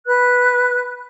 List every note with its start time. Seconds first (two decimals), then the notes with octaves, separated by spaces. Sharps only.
0.06 B4 F#6